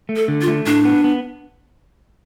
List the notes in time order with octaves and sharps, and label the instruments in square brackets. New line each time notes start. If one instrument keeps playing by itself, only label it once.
[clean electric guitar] A3
[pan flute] A4
[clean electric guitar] D3
[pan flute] F4
[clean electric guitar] A3
[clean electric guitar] A2 [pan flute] D4
[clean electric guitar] B3
B3